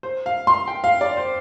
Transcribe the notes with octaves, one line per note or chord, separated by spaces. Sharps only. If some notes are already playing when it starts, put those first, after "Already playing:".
C5
F5
C6
G5
F5
D5
C5